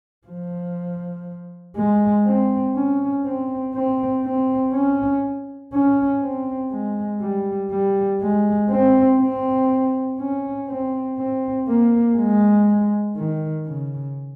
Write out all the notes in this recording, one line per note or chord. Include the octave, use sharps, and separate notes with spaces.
F3
G#3
C4
C#4
C4
C4
C4
C#4
C#4
C4
G#3
G3
G3
G#3
C4
C4
C#4
C4
C4
A#3
G#3
D#3
C#3